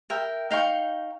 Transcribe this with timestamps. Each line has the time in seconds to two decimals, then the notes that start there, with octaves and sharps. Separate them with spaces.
0.10 A#4 E5 G5
0.51 D#4 F5 G5 C#6